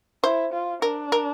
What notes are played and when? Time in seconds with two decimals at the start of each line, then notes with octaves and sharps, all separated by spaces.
0.24 E4 C5
0.53 F4
0.82 D4 A#4
1.12 A#4